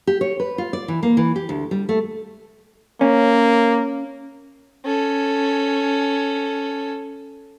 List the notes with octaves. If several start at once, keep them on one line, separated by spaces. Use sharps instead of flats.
G4
C#5
B4
F4
D5
E3
A#3
E3
G4
D2
G3
A3
A#3 C#4
C#4 A4